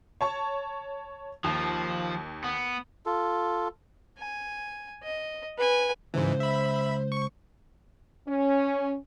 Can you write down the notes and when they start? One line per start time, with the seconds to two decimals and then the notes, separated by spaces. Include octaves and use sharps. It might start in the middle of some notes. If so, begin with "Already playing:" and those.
0.21 C#5 A5 C#6
1.44 D#2 F3
2.44 B3
3.06 F4 A4
4.18 G#5
5.03 D#5
5.58 B4 G#5
6.14 C#2 G#2 E3 C5
6.40 E5 B5
7.12 C#6
8.28 C#4